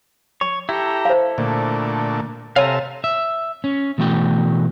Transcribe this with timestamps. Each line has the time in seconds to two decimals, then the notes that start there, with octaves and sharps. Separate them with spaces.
0.41 C#5 C#6
0.69 E4 G4 A4 A#5
1.05 C5 F5
1.38 A#2 D3 A3
2.56 C3 A4 C#5 E5 F5 G#5 A#5
3.04 E5
3.64 C#4
3.98 B2 E3 A3 F#4 G5